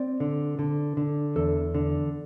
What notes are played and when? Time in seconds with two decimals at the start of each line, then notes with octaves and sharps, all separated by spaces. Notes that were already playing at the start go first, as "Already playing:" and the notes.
Already playing: C4 D5
0.20 D3
0.59 D3
0.97 D3
1.36 E2 A4
1.74 D3